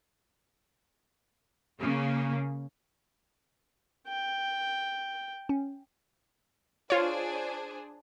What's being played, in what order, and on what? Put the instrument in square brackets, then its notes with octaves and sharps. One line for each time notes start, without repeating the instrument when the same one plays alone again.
[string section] C#3 A#3
[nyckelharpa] G5
[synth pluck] C#4
[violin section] D4 G#4 C5 [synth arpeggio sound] F4 C#5